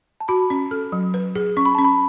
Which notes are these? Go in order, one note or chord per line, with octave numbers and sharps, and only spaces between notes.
A5
F#4 B5
C#4
A4
F#3
B4
G#4
C#4 C#6
B5
C#4 A5
B5